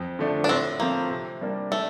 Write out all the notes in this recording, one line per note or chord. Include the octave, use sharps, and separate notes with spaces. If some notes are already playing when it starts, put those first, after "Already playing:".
Already playing: F2
D3 F3 A3 D4
D4
A2 C4
F3 A3 A#3 C4
C3
G3 A#3 D4
A3